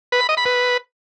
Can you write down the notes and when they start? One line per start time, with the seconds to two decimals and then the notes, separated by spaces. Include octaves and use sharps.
0.12 B4
0.21 B5
0.29 D#5
0.37 B5
0.45 B4